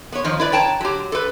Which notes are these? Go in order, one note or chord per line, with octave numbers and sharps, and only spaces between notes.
B3 C#5
F2 D#3 F3
E4 B4 D5
C#5 G5 A5 A#5
F#3 G4
A4 B4